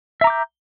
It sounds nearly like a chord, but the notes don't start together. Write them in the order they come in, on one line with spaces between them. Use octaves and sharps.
E5 A#5 D6 G6